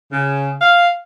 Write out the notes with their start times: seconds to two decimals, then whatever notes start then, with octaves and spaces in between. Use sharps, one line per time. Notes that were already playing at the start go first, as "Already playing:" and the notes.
0.12 C#3
0.60 F5